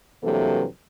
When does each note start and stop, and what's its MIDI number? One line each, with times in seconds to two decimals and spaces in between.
0.24 0.64 43
0.24 0.64 48
0.24 0.64 52
0.24 0.64 54
0.24 0.64 58
0.24 0.64 69